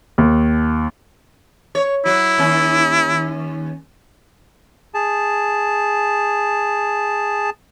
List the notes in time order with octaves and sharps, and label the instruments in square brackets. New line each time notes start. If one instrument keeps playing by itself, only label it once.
[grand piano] D#2
[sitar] C#5
[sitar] F#3 [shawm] E4
[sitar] D#2 C#4
[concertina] G#4 A5